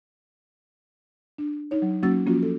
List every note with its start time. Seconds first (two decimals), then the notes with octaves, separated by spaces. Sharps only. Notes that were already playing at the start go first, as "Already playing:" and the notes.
1.38 D4
1.71 D#4 C#5
1.82 F#3
2.03 F#3 A#3 C#4 F#4 E6 A6
2.26 F3 A#3 C#4 F4 F#4
2.43 A4